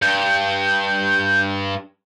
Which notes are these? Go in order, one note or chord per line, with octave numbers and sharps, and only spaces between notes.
G2 G6